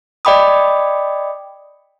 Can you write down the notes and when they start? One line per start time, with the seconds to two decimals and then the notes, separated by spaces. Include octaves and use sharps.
0.25 D5 D#5 G5 B5 D6 D#6